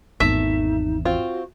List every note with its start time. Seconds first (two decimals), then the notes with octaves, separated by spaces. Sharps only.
0.20 G#1 E2 A3 D#4 E5
1.05 C4 F4 F#4